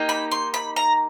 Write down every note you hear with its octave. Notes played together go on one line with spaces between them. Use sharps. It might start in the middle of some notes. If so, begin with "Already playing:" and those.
Already playing: A#3 D#4 G4
B5
C6
B5
A#5